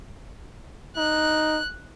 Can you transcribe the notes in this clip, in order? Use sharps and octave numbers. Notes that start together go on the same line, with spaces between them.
D#4 F#6